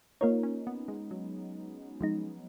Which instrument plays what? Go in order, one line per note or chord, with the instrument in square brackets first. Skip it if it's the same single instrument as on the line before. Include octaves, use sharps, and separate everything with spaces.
[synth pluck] A#3 F4 A#4 C#5 [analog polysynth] D#4
[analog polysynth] C#4
B3
G#3
F#3
[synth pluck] F3 G#3 D#4